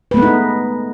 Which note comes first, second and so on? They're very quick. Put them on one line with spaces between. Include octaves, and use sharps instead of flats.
B4 A3 B3 G#3 D#4